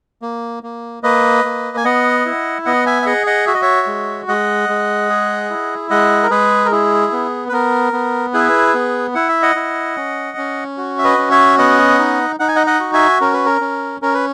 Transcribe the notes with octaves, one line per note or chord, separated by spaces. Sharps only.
A#3
A#3
A#3 B4 D#5
A#3
G#5
B3 D#5 F#5
E4
B3 D#5 F#5
E5 G#5
E5
G#4 D#5 F#5
D#5 F#5
F#4 E5
D#5
C#5 E5
G#3
G#3 D#5 F#5
G#3
G#4
E4
G#3 D#5 F#5
A#4
G#3 G#4 B4
A#4
E4 G#4
B3
B4
B3 A#4
B3
E4 G#4 B4
B3
E4 F#5
E5
D#5 F#5
E4
C#4
C#4
F#4
E5
B4 D#5
C#4
C#5 E5
B3 D#5 F#5
D#4
D#4 F#5
G#5
D#5 F#5
D#5 F#5
F#4
E5 G#5
C#4 A#4
B4
A#4
C#4
C#4 A#4
B4